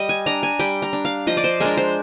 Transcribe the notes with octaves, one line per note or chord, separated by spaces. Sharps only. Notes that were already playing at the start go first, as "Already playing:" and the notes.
Already playing: G3 D#5
G#5
D4 A#5
G#5
G3 G5
A#5
D4
F5
F3 D#5
D5
C5
G#3 D4 A#4
C5